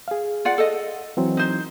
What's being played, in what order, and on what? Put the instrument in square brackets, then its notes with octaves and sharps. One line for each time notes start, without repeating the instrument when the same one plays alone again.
[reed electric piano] G#4 F5
[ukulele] F4 D5 F#5
A4 D#5
[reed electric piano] E3 F#3 C4
[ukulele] D#4 C5